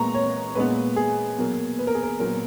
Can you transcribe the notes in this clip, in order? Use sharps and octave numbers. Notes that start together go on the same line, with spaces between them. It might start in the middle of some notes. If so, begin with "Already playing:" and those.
Already playing: A#2 G#3 B3 A#5 C#6
C#5
A#2 G#3 B3 B4
G#4
B2 F#3 A#3
B4
A#4
G#4
A#4
A#2 F#3 B3 A#4